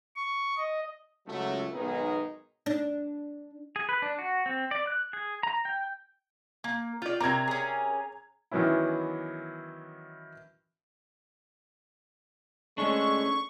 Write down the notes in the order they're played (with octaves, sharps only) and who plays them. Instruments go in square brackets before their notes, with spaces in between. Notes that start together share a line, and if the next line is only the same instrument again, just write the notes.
[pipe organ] C#6
D#5
[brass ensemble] C#2 F#3 A3
B1 G#2 D#3 B3 D#4 G#4
[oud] D4
[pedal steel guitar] G#4
B4
D4
F#4
C4
D5
F#6
G#4
A#5
G5
[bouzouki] A#3
[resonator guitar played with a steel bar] F4 D5 [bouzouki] G5
[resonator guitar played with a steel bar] C3 A#4 D5 [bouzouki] C4 [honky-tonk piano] A#5 G#6
[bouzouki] C#4 G#4
[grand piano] D#3 E3 F#3 B3 C#4 E4
[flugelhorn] G#3 [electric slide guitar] A3 C#4 D4 [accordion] C#6